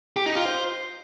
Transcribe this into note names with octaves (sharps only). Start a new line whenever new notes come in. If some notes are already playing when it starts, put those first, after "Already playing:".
G4
D#4
F4
C5